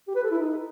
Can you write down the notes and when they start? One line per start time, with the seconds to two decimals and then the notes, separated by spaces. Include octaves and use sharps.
0.08 G4
0.16 B4
0.23 A4
0.31 E4
0.39 D#4